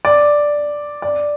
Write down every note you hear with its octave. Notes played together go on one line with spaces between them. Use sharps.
D5
D5